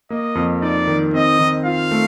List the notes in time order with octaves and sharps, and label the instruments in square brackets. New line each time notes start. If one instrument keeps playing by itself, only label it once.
[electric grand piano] A#3 [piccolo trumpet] D#5
[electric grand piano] F2
[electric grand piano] D#4 [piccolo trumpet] D5
[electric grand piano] D#3
[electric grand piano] C4 [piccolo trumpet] D#5
[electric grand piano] D#3
[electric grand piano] F4 [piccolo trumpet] F5
[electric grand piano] A3